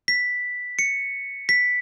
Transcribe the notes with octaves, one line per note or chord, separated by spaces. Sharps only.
B6
C#7
B6